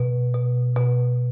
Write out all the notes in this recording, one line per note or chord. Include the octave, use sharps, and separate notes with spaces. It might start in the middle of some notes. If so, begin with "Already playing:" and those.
Already playing: B2
B2
B2